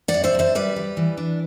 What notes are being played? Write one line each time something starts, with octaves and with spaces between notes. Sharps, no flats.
D5 F#5
F#2
C5 E5
F#2 C5 E5
G3 B4 D5
G3
E3
D4